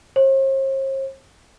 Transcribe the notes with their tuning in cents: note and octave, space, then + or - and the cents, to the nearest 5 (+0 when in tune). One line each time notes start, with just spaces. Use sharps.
C5 +45